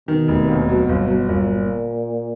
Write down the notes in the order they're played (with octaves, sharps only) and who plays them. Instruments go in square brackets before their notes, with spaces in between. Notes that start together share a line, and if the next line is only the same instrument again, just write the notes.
[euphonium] B2 [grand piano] D#3
[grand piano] F1
D#2
F#3
G1
F#3
[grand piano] G1 [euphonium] A#2